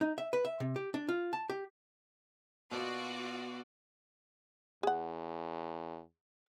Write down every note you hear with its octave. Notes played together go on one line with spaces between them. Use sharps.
D#4
E5
B4
E5
C3
G4
D4
F4
A5
G4
B2 F4 F#4 D5 D6
E2 G#4 F#5